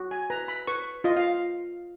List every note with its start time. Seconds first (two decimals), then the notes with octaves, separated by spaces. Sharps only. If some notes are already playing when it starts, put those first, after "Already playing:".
Already playing: F#4
0.11 G#5
0.30 B4 A#5
0.48 B5
0.67 B4 C#6
1.04 F4 D#5
1.16 F5